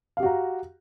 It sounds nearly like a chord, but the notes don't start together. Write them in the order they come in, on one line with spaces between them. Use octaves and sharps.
F5 G4 F#4 A#5